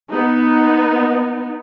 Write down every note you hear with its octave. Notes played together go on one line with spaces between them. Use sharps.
B3 D#4